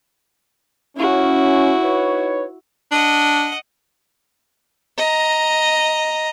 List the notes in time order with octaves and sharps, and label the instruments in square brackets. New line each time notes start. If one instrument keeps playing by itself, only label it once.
[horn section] C#4 [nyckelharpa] E4 F#4
[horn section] D#4 B4 C#5
[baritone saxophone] D4 [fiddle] D#5 F#5
[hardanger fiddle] D#5 A#5